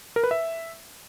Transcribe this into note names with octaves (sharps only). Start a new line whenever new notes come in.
A#4
B4
E5